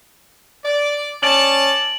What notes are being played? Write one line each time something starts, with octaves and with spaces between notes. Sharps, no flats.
D5
C#4 D5 A5 A6 D7 F#7